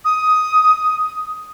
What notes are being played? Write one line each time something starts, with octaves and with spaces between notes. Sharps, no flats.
D#6